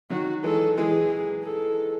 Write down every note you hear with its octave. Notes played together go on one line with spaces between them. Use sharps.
D#3 F#3 F#4
E3 G#3 A4
E3 G#3 G#4
A4